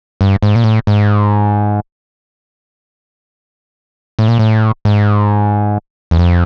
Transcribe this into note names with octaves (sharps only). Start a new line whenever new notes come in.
G2
G#2
A#2
A2
G#2
A2
A#2
A2
G#2
E2
F2